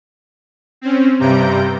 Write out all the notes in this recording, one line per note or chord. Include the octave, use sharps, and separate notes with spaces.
C4 C#4
G2 C3 G3 A#5 G6 D7